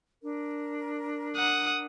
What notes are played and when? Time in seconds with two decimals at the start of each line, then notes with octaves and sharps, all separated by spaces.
0.22 D4 A#4
1.36 F#5 D#6